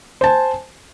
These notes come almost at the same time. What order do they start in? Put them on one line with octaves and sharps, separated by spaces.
C5 A5 G#5